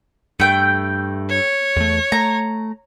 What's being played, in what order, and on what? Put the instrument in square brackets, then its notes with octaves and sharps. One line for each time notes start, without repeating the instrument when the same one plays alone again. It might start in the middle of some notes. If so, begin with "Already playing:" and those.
[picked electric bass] G2 [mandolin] A3 G5
[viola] C#5
[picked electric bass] E2 A3
[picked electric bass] A3 [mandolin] A#5